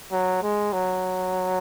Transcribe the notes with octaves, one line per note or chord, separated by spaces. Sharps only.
F#3
G#3
F#3